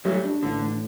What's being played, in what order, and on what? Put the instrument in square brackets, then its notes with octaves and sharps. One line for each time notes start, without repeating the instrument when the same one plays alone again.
[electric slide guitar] F#3 A3 [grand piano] G3
[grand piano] D4
[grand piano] A1 [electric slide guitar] D3
[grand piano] A2